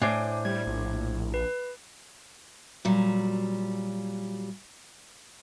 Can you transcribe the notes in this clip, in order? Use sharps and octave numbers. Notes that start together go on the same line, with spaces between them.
A2 D4 C5 G#5 D6
G3 G#6
A#1
B4
A#2 F#3 G3